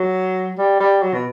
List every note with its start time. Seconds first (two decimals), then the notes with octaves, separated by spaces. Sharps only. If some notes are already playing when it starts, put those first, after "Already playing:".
Already playing: F#3
0.58 G3
0.80 G3
1.02 F#3
1.14 B2